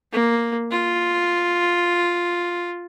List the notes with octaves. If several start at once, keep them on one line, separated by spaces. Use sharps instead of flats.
A#3
F4